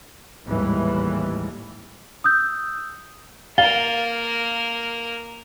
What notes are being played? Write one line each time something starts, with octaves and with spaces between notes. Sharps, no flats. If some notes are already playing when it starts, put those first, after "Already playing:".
G#1 D#2 A2 E3 G3 G#3
D#6 E6 G6
A#3 A#4 F5 A6 G7